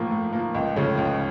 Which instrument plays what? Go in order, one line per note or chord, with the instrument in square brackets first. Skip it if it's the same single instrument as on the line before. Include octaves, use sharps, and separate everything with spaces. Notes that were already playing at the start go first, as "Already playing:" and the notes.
Already playing: [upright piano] A2 F3 A#3
A2
F3 A#3
C#2
C#3 F3 A3 C#4
C#2